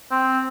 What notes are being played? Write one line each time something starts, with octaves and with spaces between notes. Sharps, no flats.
C4